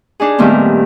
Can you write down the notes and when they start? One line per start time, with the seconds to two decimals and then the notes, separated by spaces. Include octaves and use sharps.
0.20 D4 D#4 G#4
0.38 A#2 D#3 G3 A3 B3 C4